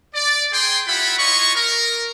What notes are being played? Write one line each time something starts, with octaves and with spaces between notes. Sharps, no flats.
D5
G#4 G5 C6
E4 F4 G4 E5 F#5 B5
E4 F4 C#5 D#5 C#6
A#4